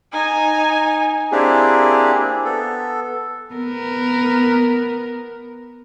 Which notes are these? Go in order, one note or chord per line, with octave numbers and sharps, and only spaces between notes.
D#4 G#5
A#3 C4 D4 E4 G4 G#4
B3 A4
B3 A#4